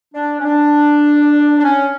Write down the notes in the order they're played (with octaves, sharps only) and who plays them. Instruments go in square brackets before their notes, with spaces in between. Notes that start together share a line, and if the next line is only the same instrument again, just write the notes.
[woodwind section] D4
C#4
D4
D4
C#4